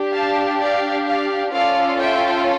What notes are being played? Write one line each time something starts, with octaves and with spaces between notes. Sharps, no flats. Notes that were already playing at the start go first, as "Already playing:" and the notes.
Already playing: D4 G4
F5 A5
D5 F5
D5 F5
C#4 F4 A4 D5 F5
E5 G5